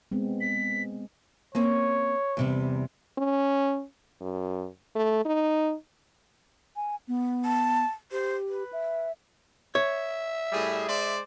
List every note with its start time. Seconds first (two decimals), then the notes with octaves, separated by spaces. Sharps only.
0.12 G#3 B3 C4
0.41 B6
1.55 A#3 C4 C#4 C#5
2.37 E2 C3 G3
3.18 C#4
4.21 F#2
4.95 A3
5.25 D#4
6.76 G#5
7.08 B3
7.45 A5
8.12 G4 C5
8.49 B4
8.73 E5
9.75 C#5 E5
10.52 A2 G3 G#4
10.88 G#3 C5 D5